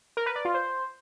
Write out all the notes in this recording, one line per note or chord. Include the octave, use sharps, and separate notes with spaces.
A#4
B4
D5
F4
C5